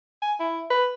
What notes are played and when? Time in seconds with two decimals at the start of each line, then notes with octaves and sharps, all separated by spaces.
0.22 G#5
0.40 E4
0.71 B4